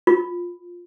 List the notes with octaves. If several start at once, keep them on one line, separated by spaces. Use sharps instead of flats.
F4